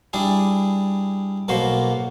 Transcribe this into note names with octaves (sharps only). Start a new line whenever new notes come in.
G3 D4 E4 G#4
B1 B2 A#3 F#4 C5